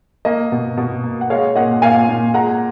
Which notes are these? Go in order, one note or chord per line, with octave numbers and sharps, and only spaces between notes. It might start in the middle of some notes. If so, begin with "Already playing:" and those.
A#3 D#5
B2
B2
A#3
F#5
G#3 C#5 F5
A#2 D#5 F#5
A#2 F5 G#5
A#2
G#3 F#5 A#5